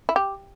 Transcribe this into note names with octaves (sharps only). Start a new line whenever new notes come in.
E4
G4